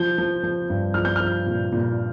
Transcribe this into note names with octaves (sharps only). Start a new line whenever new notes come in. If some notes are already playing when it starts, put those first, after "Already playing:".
Already playing: F3 G6
F3
F3
G2
F3 F6
G6
F3 F6
A#2
A#2